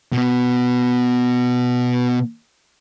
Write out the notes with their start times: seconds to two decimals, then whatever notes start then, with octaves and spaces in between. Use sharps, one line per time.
0.13 B2 B3